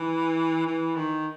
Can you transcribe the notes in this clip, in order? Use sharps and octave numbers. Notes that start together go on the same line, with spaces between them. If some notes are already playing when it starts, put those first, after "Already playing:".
Already playing: E3
E3
D#3